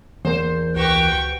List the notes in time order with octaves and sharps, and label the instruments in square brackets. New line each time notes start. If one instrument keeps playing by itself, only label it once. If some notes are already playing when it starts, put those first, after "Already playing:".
[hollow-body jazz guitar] E2 A#3 [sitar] C5
[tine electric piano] C#2 B4 [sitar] F#4 G4 [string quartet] G5 C#6